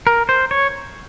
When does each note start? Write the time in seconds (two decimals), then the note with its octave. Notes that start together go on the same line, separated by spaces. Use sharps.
0.07 A#4
0.29 C5
0.51 C#5